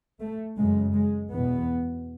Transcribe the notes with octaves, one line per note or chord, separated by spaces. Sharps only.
A3
F#2 C#3 G#3
G#3
E2 B2 B3